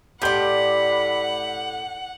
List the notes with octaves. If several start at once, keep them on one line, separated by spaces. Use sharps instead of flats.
A2 G4 D5 F#5 B5 C6 G6